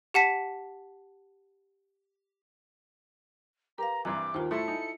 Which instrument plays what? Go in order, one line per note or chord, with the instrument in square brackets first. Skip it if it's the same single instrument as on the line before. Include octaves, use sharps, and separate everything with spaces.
[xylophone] G4 F#5 A5 B6
[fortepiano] G4 [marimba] A#4 B4 F5 [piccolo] A#5
[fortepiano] G2 C3 E3 [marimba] A#5 [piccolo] D6
[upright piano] D#2 A#4 [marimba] F4 C5
[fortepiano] A2 C6 [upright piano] E4 A4 [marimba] E5 A5 C#6 [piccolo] C#7
[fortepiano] D#4 [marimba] G#5